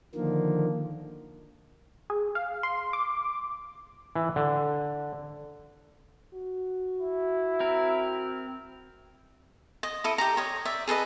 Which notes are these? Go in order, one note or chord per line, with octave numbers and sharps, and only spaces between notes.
D3 D#3 F3 A#3
G#4
F5
C6
D6
E3
D3
F#4
E4
C4 A#4
D#5
E4 A4 D#6
G4 D#5 A#5
C#5 D#5
D5 E5
G#4 A4 B4 D#5